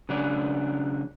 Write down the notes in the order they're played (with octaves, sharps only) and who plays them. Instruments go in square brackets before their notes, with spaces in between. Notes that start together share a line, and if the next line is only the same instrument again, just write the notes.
[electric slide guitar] C#3 F#3 D4